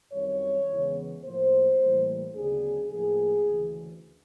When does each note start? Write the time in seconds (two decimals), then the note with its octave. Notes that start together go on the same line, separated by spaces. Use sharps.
0.12 F#2 D#3 G3 C4 C#5
0.68 E2 C#3 E3 G#3 B3
1.23 A2 F3 A#3 C5
1.79 A2 E3 G3 A#3
2.35 D2 C#3 F#3 B3 D4 G#4
2.90 A2 F3 A#3 G#4
3.46 D2 C#3 E3